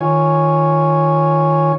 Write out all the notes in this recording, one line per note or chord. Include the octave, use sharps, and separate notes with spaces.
D#3 F4 C#5 G#5